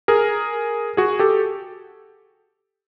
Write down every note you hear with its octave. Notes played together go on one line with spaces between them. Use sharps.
G#4 A#4
F#4 G#4
G4 A4